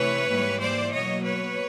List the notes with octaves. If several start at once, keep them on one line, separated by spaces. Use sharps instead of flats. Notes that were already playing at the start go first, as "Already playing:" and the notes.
Already playing: C3 E3 A3 B4 C#5
G#2 E3 G3 A#3
C5 D5
B2 F#3 A#3 C#5 D#5
B4 C#5